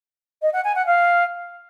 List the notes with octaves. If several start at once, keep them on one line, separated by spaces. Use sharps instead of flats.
D#5
F#5
G#5
F#5
F5